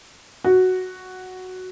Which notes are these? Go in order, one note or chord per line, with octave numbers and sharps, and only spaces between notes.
F#4